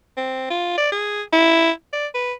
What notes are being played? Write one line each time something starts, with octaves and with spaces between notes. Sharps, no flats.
C4
F4
D5
G#4
E4
D5
B4